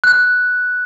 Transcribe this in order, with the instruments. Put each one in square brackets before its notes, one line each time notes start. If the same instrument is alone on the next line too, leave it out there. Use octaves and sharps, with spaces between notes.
[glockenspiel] F#6